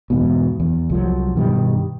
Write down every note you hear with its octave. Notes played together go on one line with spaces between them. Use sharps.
E2 G#2 B2
E2
C2 F3 F#3
G2 B2 D#3 G3